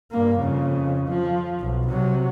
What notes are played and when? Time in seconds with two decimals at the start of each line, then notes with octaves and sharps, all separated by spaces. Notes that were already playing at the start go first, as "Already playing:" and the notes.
0.11 G2 A#3
0.40 F2 C#3
1.08 F3
1.60 B1
1.89 C3 F#3